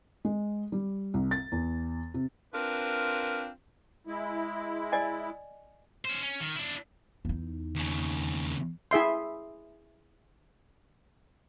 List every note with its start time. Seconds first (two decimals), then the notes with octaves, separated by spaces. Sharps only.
0.25 G#3
0.72 G3
1.14 C2
1.31 A6
1.52 E2
2.14 C3
2.53 C4 D4 F4 A#4 B4
4.07 G#3 E4
4.92 D5 D#5 G#5
6.05 C#4 C5
6.23 C#4
6.40 D#3
6.55 D4 E4
7.25 E2 D#4
7.75 D#2 C#3
8.91 E4 G#4 E5 C6